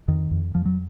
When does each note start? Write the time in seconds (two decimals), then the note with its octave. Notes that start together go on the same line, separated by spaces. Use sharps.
0.08 F2 D#3
0.31 F2
0.55 F2 F3
0.65 F#3